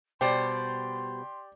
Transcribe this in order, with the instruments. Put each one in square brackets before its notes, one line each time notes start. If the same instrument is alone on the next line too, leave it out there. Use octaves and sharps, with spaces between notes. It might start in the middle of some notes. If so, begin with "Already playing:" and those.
[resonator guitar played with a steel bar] B2 G3 C5 [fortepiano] G4 D5 [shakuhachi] C6